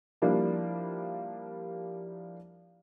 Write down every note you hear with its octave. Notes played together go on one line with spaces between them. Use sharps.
F3 G3 A#3 D4 E4